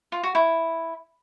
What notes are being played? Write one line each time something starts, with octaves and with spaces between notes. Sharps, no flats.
F4
F#4
E4